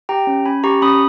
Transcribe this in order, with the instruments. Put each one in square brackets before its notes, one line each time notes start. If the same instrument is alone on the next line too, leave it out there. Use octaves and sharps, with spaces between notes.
[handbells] G4 G5 A#5
C#4
C#4 G#5 B5
G4 A#5 C#6
C#4 B5 D#6